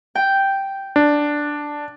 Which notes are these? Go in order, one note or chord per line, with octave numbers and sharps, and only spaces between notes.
G5
D4